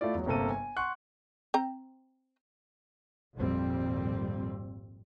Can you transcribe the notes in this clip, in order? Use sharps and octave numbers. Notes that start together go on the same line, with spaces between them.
A3 E4 F4 D5
E2 F#3
G1 C3 A#3 A4 D#7
G#5
F#5 C6 C#6 F#6
C4 G5 A#5
G#1 F2 A#2 G3 C4